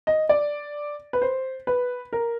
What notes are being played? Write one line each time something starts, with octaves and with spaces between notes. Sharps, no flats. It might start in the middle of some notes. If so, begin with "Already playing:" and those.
D#5
D5
B4
C5
B4
A#4